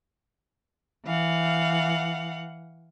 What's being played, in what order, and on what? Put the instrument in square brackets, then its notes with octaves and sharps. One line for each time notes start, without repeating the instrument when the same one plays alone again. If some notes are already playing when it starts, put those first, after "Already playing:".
[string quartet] E3 F5 F#5